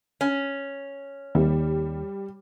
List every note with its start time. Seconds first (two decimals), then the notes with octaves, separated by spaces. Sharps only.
0.21 C#4
1.35 D#2 G3